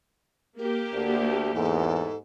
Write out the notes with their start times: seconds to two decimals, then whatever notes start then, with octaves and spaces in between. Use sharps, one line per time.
0.57 A#3 G4 A#4
0.93 D2
1.55 E2 G#2 A4